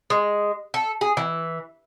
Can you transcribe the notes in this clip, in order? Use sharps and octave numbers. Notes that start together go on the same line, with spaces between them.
G#3
A4
G#4
E3